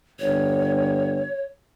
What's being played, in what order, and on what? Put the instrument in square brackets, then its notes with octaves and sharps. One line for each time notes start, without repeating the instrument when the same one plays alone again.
[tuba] G1 [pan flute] C#5